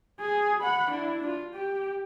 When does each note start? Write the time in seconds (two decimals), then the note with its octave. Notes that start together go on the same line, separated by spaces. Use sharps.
0.20 G#4
0.60 F#5 B5
0.91 D4 E4
1.25 F4
1.54 G4